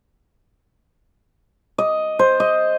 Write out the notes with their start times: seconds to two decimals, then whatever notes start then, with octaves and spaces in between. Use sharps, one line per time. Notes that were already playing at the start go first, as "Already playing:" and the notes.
1.78 D#5
2.19 C5
2.40 D#5